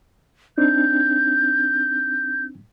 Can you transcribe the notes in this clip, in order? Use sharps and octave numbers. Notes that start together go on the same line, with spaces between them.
C4 D4 D#4 G6